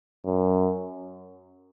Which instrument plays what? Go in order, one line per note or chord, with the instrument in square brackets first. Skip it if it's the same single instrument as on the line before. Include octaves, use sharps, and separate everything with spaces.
[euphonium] F#2